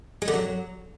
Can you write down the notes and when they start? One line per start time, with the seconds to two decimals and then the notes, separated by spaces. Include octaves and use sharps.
0.22 G#3
0.28 D3
0.34 F#3